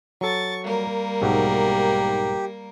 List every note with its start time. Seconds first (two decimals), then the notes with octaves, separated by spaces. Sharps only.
0.21 F#3 A4 C#6 A6
0.64 G3 A#3 A#4
1.22 B1 G#2 F#4 G4